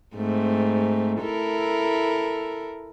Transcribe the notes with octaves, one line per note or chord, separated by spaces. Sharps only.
G#2 A3 C4
E4 A4 A#4